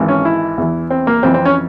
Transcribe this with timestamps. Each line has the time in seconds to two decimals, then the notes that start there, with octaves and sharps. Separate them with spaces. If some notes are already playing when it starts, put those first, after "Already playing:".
Already playing: G#1 G#2 E3
0.08 C#4
0.25 E4
0.58 E2 E3
0.90 C4
1.07 A#3
1.23 F2 E3 C4
1.34 C4
1.45 C#4